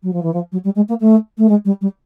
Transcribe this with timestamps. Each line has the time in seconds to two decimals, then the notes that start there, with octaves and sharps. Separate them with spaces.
0.03 F#3
0.13 F3
0.23 E3
0.34 F3
0.52 F#3
0.64 G3
0.76 G#3
0.89 A#3
1.00 A3
1.38 A3
1.49 G#3
1.65 G3
1.81 G3